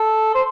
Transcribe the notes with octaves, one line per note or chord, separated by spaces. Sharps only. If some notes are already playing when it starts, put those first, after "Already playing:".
Already playing: A4
C5